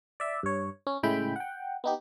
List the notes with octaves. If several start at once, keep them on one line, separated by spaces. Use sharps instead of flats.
D5 E5
G2 C#5
C#4
A2 C#3 G#3 E4 G5 B5
F#5 G5
B3 D#4 G4